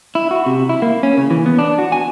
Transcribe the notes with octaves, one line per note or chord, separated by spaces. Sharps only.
E4
F#4
C3
E4
A#3
C#4
C#3
E3
B3
D4
F#4
G#5